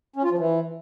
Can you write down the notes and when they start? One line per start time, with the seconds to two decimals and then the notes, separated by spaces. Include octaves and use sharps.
0.16 C#4
0.24 F4
0.31 F3
0.39 E3